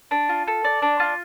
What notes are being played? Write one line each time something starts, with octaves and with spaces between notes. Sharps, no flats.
D4
F4
A4
D5
D4
F4